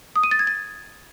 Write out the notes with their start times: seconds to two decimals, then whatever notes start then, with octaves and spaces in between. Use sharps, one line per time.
0.16 D#6
0.23 D#7
0.31 A6
0.39 G#6
0.47 A6